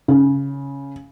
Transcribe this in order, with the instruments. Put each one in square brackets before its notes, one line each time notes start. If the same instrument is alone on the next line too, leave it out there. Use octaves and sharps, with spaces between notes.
[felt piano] C#3